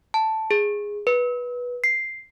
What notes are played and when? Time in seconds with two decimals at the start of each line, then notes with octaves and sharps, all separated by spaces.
0.14 A5
0.51 G#4
1.07 B4
1.84 C7